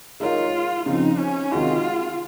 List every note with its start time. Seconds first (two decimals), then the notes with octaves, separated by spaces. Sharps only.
0.20 G#3 D#4 F4 A#4 C#5
0.86 C#3 F3 C4 D#4
1.19 C#4
1.51 C3 D#3 G#3 D#4 F4 F#4